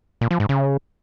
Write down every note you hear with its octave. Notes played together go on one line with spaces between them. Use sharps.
A#2
F3
G#2
C#3